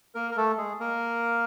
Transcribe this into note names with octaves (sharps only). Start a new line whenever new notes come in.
A#3 A#4
A#4
A3 A4
G#3 G#4
A#3 A#4